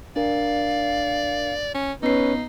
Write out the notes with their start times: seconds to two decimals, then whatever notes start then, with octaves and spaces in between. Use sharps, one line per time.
0.16 D4 A#4 D5 F5
1.75 C#4
2.03 B3 C#4 D#4 B4 C7